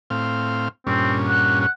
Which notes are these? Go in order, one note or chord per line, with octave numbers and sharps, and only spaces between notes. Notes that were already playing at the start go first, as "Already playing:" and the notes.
A2 C4 F5
G2 A#2 C4 C#4
F#5
F#5